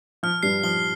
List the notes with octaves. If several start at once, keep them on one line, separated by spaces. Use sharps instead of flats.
F3 F6
G2 G3 C7
F3 G7